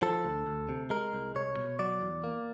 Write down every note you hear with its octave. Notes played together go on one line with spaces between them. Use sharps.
F3 A4
D2
D2
C3
G#3 A#4
C2
C2 C#5
B2
F#3 D5
E2
A#3